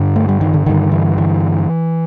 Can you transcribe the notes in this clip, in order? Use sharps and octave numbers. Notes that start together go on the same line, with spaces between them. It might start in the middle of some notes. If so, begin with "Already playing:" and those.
Already playing: G2 D3
A3
G3
D#3
D3
G2 D3 D#3
E3
E3